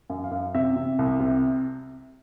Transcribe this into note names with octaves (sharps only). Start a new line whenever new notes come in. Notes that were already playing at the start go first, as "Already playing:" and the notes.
F#2
F5
F#2
C3 E5
C3
C2
C3